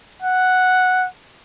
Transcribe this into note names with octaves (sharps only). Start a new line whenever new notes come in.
F#5